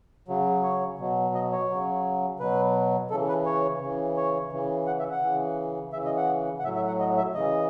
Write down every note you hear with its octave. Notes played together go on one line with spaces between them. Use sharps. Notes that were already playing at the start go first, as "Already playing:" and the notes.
C#3 F#3
C#5
B2 F#3
D#5
C#5
C#3 F#3
B2 F#3 B4
C#3 E3 A4
B4
C#5
C#3 E3
C#5
C#3 E3
F#5
E5
F#5
C#3 E3
C#3 E3 E5
D#5
F#5
F#5
A2 F#3 E5
E5
F#5
D#5
E5
C#3 E3 D#5